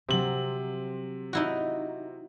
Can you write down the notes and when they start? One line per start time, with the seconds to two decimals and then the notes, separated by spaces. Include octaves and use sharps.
0.09 C3 F#3 C4 F#7
1.33 D#4 E4 F#4